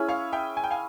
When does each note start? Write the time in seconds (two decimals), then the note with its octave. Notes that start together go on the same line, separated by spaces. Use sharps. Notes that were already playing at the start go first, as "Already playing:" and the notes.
Already playing: C#4 E4 G#4
0.08 C#5 F5
0.33 E5 G5
0.57 G#5
0.64 G5
0.71 F5 G#5